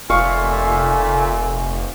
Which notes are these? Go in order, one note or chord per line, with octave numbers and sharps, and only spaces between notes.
F1 A#2 A3 F5 G#5 C#6